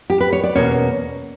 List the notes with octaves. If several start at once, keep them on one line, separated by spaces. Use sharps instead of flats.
G4
B4
C#5
D5
E2 B2 A#3 C#4 C#5